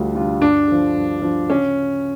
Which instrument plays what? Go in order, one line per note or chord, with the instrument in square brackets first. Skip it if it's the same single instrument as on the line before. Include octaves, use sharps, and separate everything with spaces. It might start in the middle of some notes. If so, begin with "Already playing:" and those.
Already playing: [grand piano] D2 D3 G3 D4 F4
D3 G3 D4 F4
[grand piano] G2 [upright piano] D4
[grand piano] D3 F3
G2
D3 F3
[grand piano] C#3 [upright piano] C#4